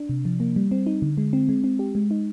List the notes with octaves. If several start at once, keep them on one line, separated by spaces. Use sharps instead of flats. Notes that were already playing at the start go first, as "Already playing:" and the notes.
Already playing: D4
C3
F3
A#3
G3
C4
D#4
D3
G#3
C4
G#3
C4
G4
G#3
D#4